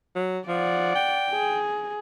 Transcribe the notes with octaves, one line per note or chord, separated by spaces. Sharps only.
F#3
F3 D5 F#5
G5
G#4